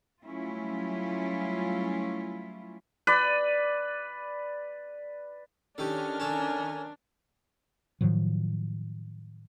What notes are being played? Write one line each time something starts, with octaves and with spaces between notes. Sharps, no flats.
F#3 G3 A3 C#4 E4 F4
B4 D5
D#3 C#4 D4 G4 A4 F6
A4 A#4 C#5 G#5 A5
A2 D#3 F3 F#3